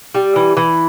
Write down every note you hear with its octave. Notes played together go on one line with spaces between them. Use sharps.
G3
E3
E3